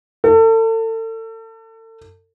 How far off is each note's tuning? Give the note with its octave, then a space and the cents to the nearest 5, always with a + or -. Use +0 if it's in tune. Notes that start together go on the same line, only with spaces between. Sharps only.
A4 +35